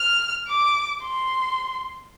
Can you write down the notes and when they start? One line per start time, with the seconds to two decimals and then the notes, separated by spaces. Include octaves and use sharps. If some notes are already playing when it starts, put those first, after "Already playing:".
Already playing: F6
0.48 D6
1.02 C6